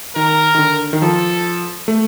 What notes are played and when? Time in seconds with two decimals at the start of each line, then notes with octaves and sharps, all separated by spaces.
0.15 D#3 A#4
0.55 D#3
0.58 D3
0.93 D#3
1.02 F3 A4
1.88 A3